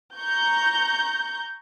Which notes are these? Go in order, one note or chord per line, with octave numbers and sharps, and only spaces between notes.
A#5 C#6 G6